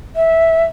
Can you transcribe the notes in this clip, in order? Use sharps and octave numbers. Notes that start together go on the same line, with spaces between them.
E5